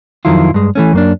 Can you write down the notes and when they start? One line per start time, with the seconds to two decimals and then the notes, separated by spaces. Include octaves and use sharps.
0.25 F2 D#3 F#3 E4 F4
0.54 G2 G#3
0.75 E3 A3 C#4
0.93 F#2 A#3 D4